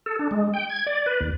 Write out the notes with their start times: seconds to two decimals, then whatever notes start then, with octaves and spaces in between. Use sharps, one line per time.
0.06 A4
0.19 D4
0.31 G#3
0.54 G5
0.69 G#6
0.86 D5
1.06 B4
1.20 D#2